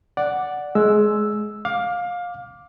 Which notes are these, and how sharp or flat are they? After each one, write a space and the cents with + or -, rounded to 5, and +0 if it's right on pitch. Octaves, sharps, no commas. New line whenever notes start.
D5 +0 F#5 +0
G#3 +20 E6 +0
F5 +20 D6 +0